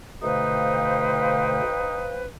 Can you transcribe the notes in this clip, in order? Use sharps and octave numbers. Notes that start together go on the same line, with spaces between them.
B2 D3 A3 D#4 B4 C5 F5 G5